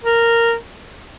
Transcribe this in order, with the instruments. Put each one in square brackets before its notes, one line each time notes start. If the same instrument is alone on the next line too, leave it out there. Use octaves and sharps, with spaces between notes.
[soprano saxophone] A#4